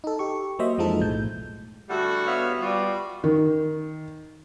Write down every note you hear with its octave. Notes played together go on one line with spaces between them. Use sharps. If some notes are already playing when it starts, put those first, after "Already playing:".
D#4 A4
G4 C#6
F#3 A#3 C5 D#5 E5
F2 E3 F3 G#3 D#4 A4
B1 A2 G6
D3 G3 A3 E4 F#4 F#5
B3 C#5 E5 F5
G3 B3 F4 F#4
D#3